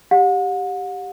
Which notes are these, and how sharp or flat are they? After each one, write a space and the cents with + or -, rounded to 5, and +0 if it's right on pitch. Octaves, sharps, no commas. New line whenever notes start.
G4 +0 F#5 -40